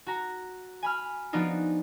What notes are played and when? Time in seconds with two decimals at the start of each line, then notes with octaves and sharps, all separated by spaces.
0.07 F#4 A#5
0.82 G#5 B5 F6
1.33 F3 B3 D4 D#4 F4 F#4